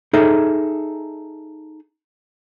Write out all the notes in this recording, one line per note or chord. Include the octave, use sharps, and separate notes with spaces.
D#4 G#4 A4 E5